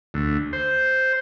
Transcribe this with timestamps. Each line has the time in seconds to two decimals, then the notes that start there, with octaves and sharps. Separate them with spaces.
0.14 D2
0.53 C5